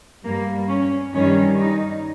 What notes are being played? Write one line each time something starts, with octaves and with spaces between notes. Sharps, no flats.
G2 G3 A#3
C#4
G2 D#3 G3 C#4
D#4